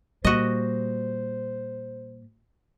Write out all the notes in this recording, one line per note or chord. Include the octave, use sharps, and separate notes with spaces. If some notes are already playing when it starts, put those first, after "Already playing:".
A#2 G3 F#4 C5 D#5